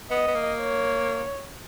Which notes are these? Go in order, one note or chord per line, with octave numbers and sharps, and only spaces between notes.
B3 D#5
B3
A#3
C#5